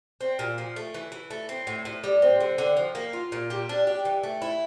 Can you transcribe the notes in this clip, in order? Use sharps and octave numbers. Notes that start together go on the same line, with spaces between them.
C4
A#2
F3
A3
E3
E3
A3
C4
A2
A2
G3
C4
D3
D3
F3
A#3
F4
A#2
G3
D4
G4
E3
A3
E4